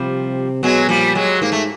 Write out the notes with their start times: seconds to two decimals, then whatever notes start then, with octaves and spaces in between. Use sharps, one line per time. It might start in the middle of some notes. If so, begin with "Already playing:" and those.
Already playing: C3 F3 G3
0.63 B2 F#3 G#3
0.89 A#2 F3 G3
1.15 F#3 G#3
1.42 G#2 A#3
1.52 A3